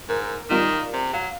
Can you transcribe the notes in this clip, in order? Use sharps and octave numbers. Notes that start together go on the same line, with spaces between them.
G#2 A#4
D#3 G3 F4 A#4
C3
F#3 F5